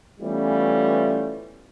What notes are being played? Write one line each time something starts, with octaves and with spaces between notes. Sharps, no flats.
E3 G3 A3 B3 C#4 F4